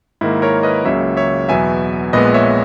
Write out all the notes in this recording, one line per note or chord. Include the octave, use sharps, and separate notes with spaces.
G#2 D#3 A#3 E4
A#4 C#5
B4 D#5
C#2 C#3 F#3 A#3 C#5 E5
C#5 E5
E2 B2 F#3 B3 E5 G#5
A#1 A#2 G#3 B3 B4 D#5
C#5 E5